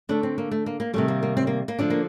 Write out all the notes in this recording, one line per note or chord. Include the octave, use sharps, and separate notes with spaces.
D3 A3 D4
C4
A#3
A3
A#3
A#3
C3 D#3 G3 A3
A#3
A#3
C4
A#3
A#3
D3 F3 A3 D4
A#3